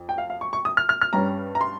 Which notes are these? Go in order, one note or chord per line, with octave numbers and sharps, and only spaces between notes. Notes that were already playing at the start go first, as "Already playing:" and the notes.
Already playing: F2
G5
F5
F5
C#6
C#6
D#6
F6
F6
F6
G2 G3 C#4 A#5
A#5
C6